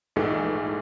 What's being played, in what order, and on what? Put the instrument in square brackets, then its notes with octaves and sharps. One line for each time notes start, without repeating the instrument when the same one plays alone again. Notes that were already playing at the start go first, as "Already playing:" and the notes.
[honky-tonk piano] A#1 G#2 E3 A3